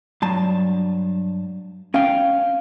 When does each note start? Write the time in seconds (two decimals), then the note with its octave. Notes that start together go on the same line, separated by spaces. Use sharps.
0.22 G2 F#3 A5
1.94 C#4 F5 G5